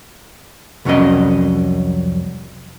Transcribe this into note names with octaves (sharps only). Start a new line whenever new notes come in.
C2 F2 F#3 C#4 A#4 D#5